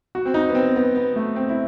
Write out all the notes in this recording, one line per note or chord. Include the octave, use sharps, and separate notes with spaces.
F#4
C4
D#4
B3
C4
B3
B3
A3
C4
E4